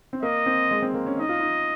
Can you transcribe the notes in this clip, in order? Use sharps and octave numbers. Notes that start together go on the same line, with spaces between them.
C4
A#3 D#5
C4
G#3
C4
A#3
C#4
D#4 D#5
F4
D#4